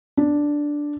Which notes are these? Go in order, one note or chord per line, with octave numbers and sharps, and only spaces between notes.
D4